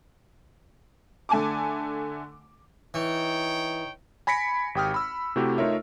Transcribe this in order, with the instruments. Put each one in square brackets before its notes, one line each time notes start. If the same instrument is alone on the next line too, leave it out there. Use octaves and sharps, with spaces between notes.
[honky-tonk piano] D3 A3 G#5 A5 D6
[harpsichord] E3 [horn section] D#4 C#5 G5
[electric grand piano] G#5 B5 A#6 B6 C#7 D7
G#1 G4 G5 D#6 F6
B5 E6
C3 A3 E4 F#4 G4
A3 D#4 F4 A#4 C#5 E5